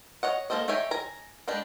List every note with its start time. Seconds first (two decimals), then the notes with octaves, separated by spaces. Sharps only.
0.23 C#5 D#5 F#5
0.50 A#3 D4 A4 C5 D#5
0.68 D#4 G4 C#5 E5 G#5
0.91 G#5 A#5
1.48 G3 G#3 D4 G4